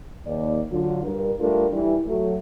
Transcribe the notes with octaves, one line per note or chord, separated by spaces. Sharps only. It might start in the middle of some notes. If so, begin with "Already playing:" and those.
D#2 D5
D3 F#3 F4
G2 A#4
G3 A3 D4 F4 A4 A#4
E3 G3
F#3 A3